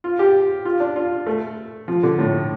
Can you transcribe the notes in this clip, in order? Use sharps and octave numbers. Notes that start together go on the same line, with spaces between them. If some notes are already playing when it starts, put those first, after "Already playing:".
F4
G4
F4
D4
F4
A3
F3
D3
A2